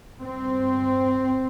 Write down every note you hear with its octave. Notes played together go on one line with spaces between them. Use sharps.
G2 C4